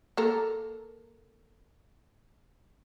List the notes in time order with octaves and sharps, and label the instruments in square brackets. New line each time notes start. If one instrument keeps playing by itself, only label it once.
[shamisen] A#3 A4 A#4